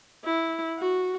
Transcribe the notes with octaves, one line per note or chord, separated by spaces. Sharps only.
E4
F#4